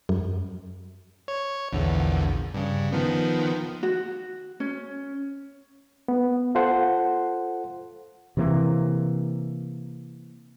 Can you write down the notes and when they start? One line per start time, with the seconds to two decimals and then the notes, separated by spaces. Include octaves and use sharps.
0.09 F#2
1.28 C#5
1.72 A#1 E2 D3
2.54 G2 C#3
2.93 D#3 F3 B3
3.83 F#4
4.60 C#4
6.08 B3
6.55 F4 A4 C5 F#5
8.37 C3 E3 A#3